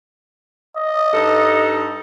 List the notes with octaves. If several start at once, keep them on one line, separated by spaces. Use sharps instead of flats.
D#5
G2 D#4 A4